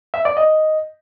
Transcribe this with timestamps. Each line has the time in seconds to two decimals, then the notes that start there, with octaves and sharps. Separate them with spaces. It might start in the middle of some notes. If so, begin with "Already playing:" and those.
0.14 E5
0.25 D5
0.37 D#5